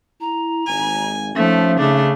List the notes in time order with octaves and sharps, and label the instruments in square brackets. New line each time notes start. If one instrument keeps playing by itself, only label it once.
[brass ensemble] E4 [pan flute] A#5
[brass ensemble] G#1 [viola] G#5
[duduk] F3 [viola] A3 [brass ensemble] C#4 D#4 [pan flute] E5
[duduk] C#3 [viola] A3 D4